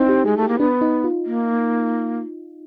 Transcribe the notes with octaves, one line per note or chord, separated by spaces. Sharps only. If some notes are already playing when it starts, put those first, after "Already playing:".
Already playing: C4 D#4 E4
G4
G#3 G#4
A3
G4
A#3
B3 D4
D#4
F4
A#3